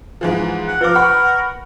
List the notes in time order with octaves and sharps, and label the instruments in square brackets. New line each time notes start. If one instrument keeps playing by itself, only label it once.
[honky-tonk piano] G#2 E3 F3
[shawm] F#5
[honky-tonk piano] F3 D6 [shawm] A#4 [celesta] B4
[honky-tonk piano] F#5 B5 C#6